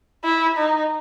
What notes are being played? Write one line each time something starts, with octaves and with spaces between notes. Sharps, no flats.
E4
D#4